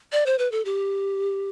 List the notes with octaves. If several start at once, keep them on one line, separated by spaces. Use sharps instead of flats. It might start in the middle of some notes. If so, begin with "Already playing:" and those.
D5
C5
B4
A4
G4